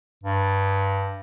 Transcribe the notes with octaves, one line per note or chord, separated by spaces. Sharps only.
G2